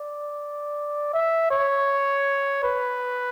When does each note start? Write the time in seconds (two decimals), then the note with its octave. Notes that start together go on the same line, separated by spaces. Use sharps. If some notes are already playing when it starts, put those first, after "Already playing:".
Already playing: D5
1.13 E5
1.50 C#5
2.63 B4